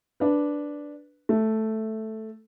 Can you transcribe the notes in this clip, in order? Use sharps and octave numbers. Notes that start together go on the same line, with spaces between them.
D4 B4
A3